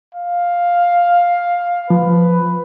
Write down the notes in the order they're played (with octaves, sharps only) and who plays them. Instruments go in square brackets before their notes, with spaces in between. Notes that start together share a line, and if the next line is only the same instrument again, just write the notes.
[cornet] F5
[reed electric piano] F3 [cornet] B4